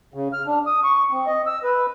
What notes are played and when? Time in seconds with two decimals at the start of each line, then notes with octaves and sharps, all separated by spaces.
0.14 C#3
0.33 F6
0.47 D4
0.66 D#6
0.84 C#6
1.11 C4
1.27 D#5
1.47 E6
1.64 B4